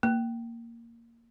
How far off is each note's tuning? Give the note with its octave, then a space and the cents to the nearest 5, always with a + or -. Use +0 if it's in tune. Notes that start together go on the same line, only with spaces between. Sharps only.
A#3 -5